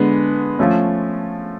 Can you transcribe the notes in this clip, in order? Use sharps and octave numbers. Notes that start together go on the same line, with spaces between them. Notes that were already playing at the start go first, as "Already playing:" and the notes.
Already playing: D3 G#3 B3
F3 A3 C#4